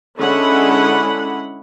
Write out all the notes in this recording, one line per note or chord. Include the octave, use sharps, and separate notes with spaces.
D3 G#3 C#4 E4 F#5 B5